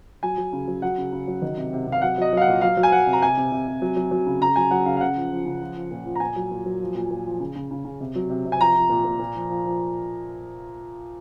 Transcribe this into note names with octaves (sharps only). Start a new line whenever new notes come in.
F#3 G#5
F#3
C#3
F#3
F#3 F#5
C#3
C#3
F#3
D#3
C3
C3
C3
F5
F#3 F#5
F#3 D#5
F#3 F5
F#5
A#2
F#3 F5
F#3
G#5
F#3 F#5
C3
A#5
C3 G#5
C3
C3
C3
F#3
F#3
F#3
C#3
C#3 A#5
F#3 G#5
F#3 F#5
C#3 F5
F5
C#3 F#5
F3
F3
C#3
F3
F3
A#2
F3
A#5
A#2 G#5
F#3
A#2
F#3
F3
A#2
A#2
F3
C#3
C#3
C#3
C#3
C3
F#3
C3
C3
G#5
F3 A#5
F3
A#2
A#2
A#2
F3
F3
F3